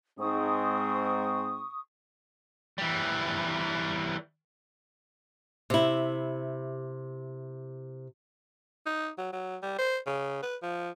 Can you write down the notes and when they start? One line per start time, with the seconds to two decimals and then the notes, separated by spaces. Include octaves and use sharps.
0.20 G#2 C4 C#6 D#6
2.78 E3 G3
5.70 C3 E4
8.86 D#4
9.18 F#3
9.33 F#3
9.63 G3
9.79 C5
10.07 C#3
10.43 B4
10.63 F3